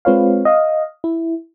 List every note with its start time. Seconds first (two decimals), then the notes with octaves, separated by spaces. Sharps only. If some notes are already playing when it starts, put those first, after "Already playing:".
0.05 G#3 C4 F4 B4 C#5 F5
0.45 D#5 F5
1.04 E4